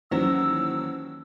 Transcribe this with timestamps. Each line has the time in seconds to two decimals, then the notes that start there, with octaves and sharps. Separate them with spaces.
0.11 D#2 E3 F#3 C#4 C5 E6 A#6